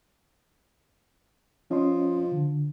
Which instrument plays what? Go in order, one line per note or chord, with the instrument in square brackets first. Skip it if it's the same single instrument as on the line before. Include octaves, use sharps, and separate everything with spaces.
[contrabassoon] F3 [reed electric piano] C#4 D#5 C6
[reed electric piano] D3